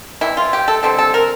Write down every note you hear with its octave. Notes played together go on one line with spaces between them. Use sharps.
C3 E3 G3 E4
F4
G4
A4
D3 G3 C4 A4
A4
A#4